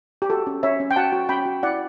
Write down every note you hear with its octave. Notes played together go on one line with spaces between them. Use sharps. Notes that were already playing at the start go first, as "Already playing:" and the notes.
G4
F#4 A4
C#4
C#4 C#5 E5
C#4
G5
F#4 F#5 A5
F#4
C#4 G5 B5
F#4
E4 D5 F#5